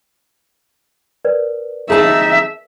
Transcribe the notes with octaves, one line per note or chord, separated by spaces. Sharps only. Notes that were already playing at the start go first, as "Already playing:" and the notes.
A#4 B4 D5
D#4 G#4 E5 A5